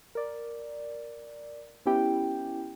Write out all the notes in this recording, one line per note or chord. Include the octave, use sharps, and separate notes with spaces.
A#4 D5
B3 C#4 E4 G4 G5